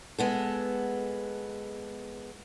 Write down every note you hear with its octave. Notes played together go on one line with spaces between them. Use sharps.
G#3 B3 A4